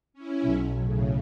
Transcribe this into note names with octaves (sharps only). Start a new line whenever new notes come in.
C#4 E4
B1
A2 C#3